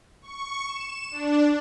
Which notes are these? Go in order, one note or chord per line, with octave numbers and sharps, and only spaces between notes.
C#6
E7
D4